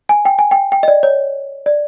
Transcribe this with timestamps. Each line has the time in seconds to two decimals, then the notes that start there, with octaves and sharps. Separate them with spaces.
0.09 G#5
0.25 G5
0.39 G#5
0.51 G5
0.72 G5
0.83 D#5
0.88 D5
1.03 C#5
1.66 D5